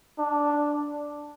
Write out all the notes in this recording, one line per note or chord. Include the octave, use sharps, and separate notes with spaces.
D4